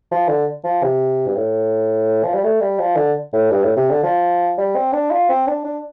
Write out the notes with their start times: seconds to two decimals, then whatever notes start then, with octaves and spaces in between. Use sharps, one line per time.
0.11 F3
0.29 D3
0.64 F3
0.83 C3
1.27 G2
1.36 A2
2.24 F3
2.33 G3
2.44 A3
2.60 G3
2.79 F3
2.96 D3
3.33 A2
3.51 G2
3.63 A2
3.76 C3
3.91 D3
4.03 F3
4.58 G3
4.75 C4
4.93 D4
5.11 F4
5.29 C4
5.47 D4
5.64 D4